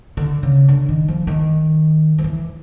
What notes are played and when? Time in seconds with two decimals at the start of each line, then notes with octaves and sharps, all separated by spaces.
0.17 D3
0.43 C#3
0.68 D3
0.89 D#3
1.08 F3
1.27 D#3
2.18 F3
2.24 E3